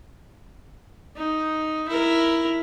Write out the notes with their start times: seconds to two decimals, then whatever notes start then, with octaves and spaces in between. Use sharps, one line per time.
1.17 D#4
1.89 E4 A#4